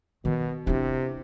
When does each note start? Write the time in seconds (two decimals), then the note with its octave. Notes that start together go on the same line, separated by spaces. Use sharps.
0.25 B2 D#3
0.67 C3 D4 E4